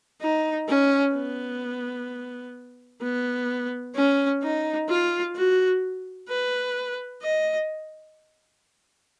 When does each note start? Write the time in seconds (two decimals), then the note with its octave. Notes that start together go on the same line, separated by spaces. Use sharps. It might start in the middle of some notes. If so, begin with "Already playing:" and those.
0.21 D#4
0.68 C#4
1.15 B3
3.02 B3
3.95 C#4
4.42 D#4
4.89 F4
5.35 F#4
6.29 B4
7.22 D#5